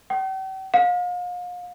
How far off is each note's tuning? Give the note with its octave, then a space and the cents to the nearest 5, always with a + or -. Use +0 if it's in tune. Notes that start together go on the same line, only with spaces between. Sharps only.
G5 -45
F5 +40